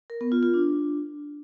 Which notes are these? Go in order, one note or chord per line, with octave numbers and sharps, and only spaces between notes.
A#4
B3
F4
F4
D4